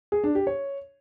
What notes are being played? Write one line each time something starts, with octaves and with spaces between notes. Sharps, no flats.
G#4
D4
G4
C#5